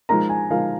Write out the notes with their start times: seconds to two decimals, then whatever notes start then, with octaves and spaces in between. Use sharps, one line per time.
0.09 F3 G#3 D#4 A#4 A#5
0.29 G#5
0.50 F3 G#3 D#4 A#4 F5